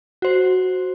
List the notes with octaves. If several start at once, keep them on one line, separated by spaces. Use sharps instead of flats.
F#4 C5